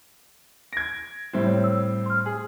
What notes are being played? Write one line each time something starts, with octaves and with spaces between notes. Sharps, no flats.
G#6 A#6 D7
A2 G3 C4
C#5
E6
C6 F6
G#4